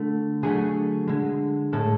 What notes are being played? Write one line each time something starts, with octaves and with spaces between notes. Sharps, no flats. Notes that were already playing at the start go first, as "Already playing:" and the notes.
Already playing: D3 A3
D3 F#3 A3 G#4
D3 G#3
A2 G#3 A4